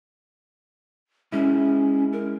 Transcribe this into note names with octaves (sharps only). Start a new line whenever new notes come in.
G#3 C#4 E4
A#4